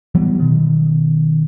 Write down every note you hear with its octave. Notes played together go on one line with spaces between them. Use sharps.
E3 F#3 G3 B3
B2 D#3